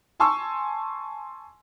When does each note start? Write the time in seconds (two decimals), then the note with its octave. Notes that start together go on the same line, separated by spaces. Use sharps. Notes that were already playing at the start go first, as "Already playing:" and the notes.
0.20 G#5 A5 C6 C#6 E6